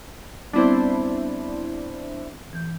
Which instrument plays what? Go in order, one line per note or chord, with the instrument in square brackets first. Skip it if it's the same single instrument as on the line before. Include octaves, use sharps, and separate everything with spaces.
[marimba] G3 B3 C4 [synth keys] D4 E4 C5
[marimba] E3 G6